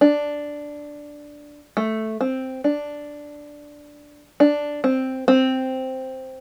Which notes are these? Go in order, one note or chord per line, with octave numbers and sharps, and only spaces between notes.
D4
A3
C4
D4
D4
C4
C4